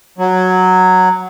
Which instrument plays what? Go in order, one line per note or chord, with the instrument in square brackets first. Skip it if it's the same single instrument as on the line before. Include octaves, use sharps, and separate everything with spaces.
[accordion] F#3